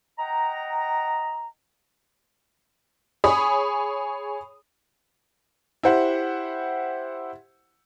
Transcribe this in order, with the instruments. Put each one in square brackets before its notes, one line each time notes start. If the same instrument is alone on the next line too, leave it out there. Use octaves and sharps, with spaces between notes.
[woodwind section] D#5 F#5 G5 A#5
[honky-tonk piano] G#4 C#5 B5 D#6
[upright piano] E4 G4 C5 F#5